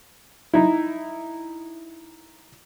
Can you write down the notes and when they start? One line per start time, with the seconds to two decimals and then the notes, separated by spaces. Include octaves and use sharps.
0.54 D#4 E4